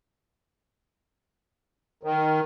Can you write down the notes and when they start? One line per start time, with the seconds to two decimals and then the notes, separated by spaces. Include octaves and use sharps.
2.03 D#3